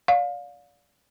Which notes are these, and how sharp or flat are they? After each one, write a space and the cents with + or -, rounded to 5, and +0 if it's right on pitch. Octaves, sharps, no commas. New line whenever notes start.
D5 -30 F5 +25